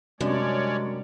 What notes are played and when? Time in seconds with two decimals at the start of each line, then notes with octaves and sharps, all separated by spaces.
0.21 F#2 C3 G3 G#3 C#4 D4 C#5 D5